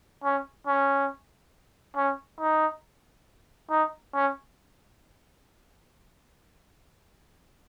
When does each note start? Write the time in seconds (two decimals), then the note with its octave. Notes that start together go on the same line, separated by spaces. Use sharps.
0.24 C#4
0.67 C#4
1.97 C#4
2.40 D#4
3.71 D#4
4.14 C#4